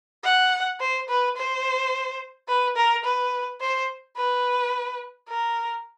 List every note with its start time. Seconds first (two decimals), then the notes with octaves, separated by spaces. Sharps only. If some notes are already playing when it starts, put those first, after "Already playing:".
0.24 F#5
0.80 C5
1.09 B4
1.37 C5
2.48 B4
2.77 A#4
3.05 B4
3.61 C5
4.17 B4
5.29 A#4